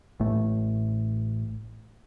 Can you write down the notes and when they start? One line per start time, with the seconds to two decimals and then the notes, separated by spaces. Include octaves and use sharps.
0.20 A1 A2 A3